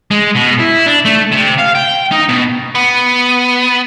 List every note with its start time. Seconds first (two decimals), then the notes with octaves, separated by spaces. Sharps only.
0.11 G#3
0.36 B2
0.60 E4
0.87 D4
1.05 A3
1.32 C3
1.59 F5
1.75 G5
2.11 D#4
2.28 B2
2.75 B3